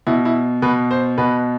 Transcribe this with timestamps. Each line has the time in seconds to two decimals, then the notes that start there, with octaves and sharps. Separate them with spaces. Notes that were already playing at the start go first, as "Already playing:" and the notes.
0.07 B2 E4
0.25 E4
0.62 B2 B4
0.91 C5
1.18 B2 B4